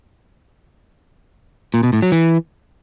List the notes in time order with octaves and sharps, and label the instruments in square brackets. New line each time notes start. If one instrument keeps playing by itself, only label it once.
[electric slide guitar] A#2
B2
A2
F#3
E3